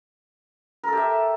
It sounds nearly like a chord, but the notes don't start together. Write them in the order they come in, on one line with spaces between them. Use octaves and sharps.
A#4 A4 G4 E5